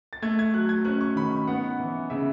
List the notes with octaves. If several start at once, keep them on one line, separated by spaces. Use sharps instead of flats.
A6
A3 G#6
G#6
F#3 F#6
G#6
C#4 F#6
C#6
D#3 B5
B3 F#5
E3
C#3 E5